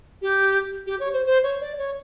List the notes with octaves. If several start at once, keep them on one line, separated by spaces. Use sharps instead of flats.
G4
G4
C#5
C5
C5
C#5
D5
C#5